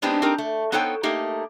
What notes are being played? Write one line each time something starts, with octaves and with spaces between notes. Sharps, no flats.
G#3 B3 C4 D4 D#4 G4
C4 D#4 G4 A#4
A3
B3 D#4 A4 C5 C#5 G5
A3 A#3 D#4 G4